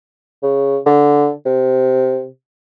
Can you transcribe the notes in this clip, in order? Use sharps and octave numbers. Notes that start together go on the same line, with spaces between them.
C#3
D3
C3